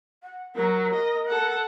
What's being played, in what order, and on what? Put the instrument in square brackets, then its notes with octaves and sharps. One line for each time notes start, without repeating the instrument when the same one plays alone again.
[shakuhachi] F#5
[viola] F#3 [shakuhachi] A#4
[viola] D#5
A4 F#5